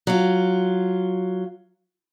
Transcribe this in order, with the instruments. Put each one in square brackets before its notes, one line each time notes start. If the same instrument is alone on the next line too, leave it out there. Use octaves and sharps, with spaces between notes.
[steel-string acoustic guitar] F#3 F4